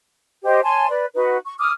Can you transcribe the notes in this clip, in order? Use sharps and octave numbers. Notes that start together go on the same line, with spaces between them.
G4 C5 D#5
C#5 G#5 A5 C6
B4 D5
D#4 F#4 B4
C#6
D6 D#6 F6